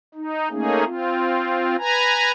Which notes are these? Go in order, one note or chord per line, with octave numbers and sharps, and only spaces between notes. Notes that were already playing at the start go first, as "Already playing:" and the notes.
D#4
A3 A#3 C#4 D#4 G#4
C4 F4
B4 G#5 A#5